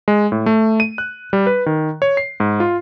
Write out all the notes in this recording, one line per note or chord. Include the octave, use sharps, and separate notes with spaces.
G#3
A2
A3
D#7
F#6
G3
B4
D#3
C#5
C7
G#2
F4